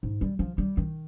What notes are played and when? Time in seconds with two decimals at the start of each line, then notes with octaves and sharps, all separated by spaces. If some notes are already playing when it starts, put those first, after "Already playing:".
0.03 G#2
0.21 G3
0.39 F3
0.58 G3
0.77 D#3